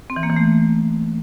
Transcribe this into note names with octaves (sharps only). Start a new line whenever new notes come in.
C4
E3
A#3
E3
A3